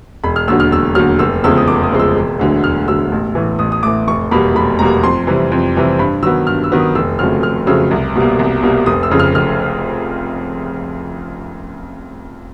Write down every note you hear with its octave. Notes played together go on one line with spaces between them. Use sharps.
E1 B5
F6
D#2 D3 F#3 E6
F6
E1 E6
D#2 D3 F#3 F6
F1 E6
E2 C#3 F3 G#3 E6
D#6
F1 D6
D#6
E2 C#3 F3 G#3
E6
E1
D2 D3 F#3
E1 F6
D2 D3 F#3 E6
A1
A2 E3
A1 D#6
D#6
A2 E3 D6
F1 C#6
E2 B2 G3 A#3 B5
F1 B5
E2 B2 G3 A#3 A#5
F2 C6
C3 E3 G3
F2
C3 E3 G3
G2 B5
D#3 F#3 B3 E6
G2 F6
E6
D#3 F#3 B3
D#6
F1 E6
F2 C#3 F#3 A3 F6
F1 F6
F2 C#3 F#3 A3 E6
C2
B2 G3 A#3
C2
B2 G3 A#3
F1 D#6
E6
F2 C#3
F6
F1 F6